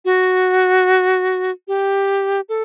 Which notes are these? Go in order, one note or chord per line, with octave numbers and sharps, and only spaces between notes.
F#4
G4
A4